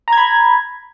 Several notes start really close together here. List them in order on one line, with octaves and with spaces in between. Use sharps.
A#5 G#6 B5